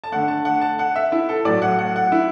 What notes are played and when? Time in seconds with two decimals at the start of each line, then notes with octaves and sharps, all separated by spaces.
0.04 A5
0.12 D3 A3 F#5
0.28 A5
0.45 F#5
0.61 A5
0.79 F#5
0.96 E5
1.12 E4
1.29 A4
1.45 A2 F#3 A3 D5
1.62 F#5
1.79 F#5
1.96 F#5
2.12 E4